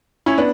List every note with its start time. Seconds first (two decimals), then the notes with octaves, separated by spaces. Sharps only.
0.26 C#4 E4
0.38 B3 D4